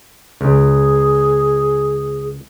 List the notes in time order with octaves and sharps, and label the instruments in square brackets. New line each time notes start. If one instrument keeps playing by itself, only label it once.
[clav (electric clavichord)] C#2 [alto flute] G#4